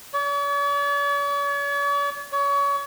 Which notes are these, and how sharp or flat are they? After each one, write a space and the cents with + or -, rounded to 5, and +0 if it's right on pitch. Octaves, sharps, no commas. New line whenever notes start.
C#5 +45
C#5 +30